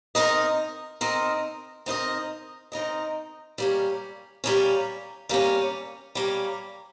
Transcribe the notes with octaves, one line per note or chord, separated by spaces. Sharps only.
C4 D#4 A#4 D#5
C4 D#4 A#4 D#5
C4 D#4 A#4 D#5
C4 D#4 A#4 D#5
G3 A#3 C#4
G3 A#3 C#4
G3 A#3 C#4
G3 A#3 C#4